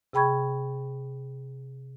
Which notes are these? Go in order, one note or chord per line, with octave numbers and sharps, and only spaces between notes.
C3 G#4 G5 B5 C#6 G#6